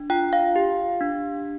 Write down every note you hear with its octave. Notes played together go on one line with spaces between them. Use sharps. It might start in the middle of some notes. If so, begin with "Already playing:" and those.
Already playing: D4
F4 G5
F5
G4
D4